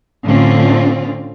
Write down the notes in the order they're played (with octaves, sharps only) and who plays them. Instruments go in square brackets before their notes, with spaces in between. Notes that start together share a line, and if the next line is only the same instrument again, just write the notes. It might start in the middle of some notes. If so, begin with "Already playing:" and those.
[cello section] A2 D3 C4 C#4 F4